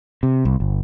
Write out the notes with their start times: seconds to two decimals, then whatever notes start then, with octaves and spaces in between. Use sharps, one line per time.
0.23 C3
0.45 C2
0.60 G1